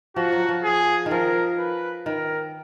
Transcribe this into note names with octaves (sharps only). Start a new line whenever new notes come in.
F3 F#4
F#3
F3
G#4
D#3
F3 A#4
B4
D#3 A#4